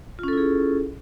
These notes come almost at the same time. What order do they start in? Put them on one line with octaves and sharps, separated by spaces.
F4 C#4 A4 E4 G#4